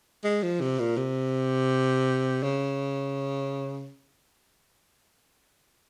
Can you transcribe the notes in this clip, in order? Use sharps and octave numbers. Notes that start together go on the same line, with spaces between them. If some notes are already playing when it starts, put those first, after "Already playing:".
G#3
F3
C3
A#2
C3
C#3